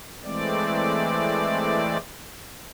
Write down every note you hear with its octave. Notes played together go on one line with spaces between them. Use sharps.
E3 G#3 A3 C4 D5